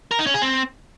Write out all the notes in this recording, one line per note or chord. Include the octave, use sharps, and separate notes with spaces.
A#4
D#4
C#4
G#4
C4